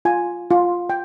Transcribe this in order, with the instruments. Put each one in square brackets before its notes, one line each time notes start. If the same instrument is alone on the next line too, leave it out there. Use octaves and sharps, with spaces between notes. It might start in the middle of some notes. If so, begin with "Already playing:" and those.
[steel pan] F4 G#5
F4
G5